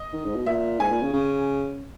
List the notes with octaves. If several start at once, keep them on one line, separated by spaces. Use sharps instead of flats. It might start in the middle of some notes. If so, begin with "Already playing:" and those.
Already playing: D#5
D#3
G#2
B2
A#2 E5
G#2 G#5
A#2
C#3
C#3